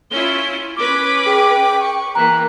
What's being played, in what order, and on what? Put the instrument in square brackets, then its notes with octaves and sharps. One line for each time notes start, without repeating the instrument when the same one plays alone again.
[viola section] C#4 E4 F4 [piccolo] G7
[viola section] C#4 B4 B5 [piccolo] D6
[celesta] G#4 [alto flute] G5
[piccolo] C#6
[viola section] E3 A#3 [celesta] A#5 B6 [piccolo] F#6